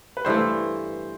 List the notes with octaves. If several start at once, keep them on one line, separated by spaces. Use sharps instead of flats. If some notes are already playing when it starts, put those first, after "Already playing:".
B4
G2 E3 A3 C5